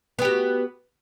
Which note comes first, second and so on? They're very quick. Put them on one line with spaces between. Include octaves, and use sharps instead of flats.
B3 G4 F#4